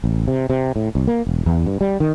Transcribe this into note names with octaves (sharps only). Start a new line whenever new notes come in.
A1
C3
C3
A2
C2
A#3
E1
E2
G2
G3
D#3